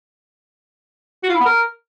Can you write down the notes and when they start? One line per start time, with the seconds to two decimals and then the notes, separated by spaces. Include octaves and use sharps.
1.23 F#4
1.29 F4
1.35 E4
1.40 B3
1.46 A#4